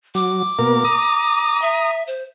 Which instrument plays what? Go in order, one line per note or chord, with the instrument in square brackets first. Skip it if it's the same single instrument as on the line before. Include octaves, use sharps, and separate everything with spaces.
[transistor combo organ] F#3 [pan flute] D6
[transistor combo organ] B2 A#3 A#4
A#5 D#6
[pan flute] E5
C5